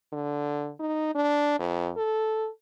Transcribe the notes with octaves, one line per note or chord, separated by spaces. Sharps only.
D3
D#4
D4
F2
A4